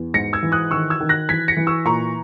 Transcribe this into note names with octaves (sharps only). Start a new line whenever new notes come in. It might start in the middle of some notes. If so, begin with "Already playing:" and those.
Already playing: E2
G#2 A#6 C#7
E6 G#6
E3
D#6 F#6
D#3 C#6 E6
E6 G#6
D#3
F#6 A#6
E3 G#6 B6
A#6 C#7
E3
C#6 E6
A#2 A#5 C#6